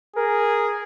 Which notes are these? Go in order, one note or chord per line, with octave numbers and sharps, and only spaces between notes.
G#4 A#4